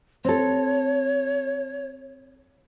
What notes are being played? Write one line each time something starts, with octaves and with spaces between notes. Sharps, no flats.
C4 A4 C#5